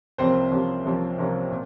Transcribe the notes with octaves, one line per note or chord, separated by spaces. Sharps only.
C2 C3 F3 A#3 C4 C#4 C5
C2 C3 F3 A#3 C#4
C2 C3 F3 A#3 C#4
C2 C3 F3 A#3 C#4
A#2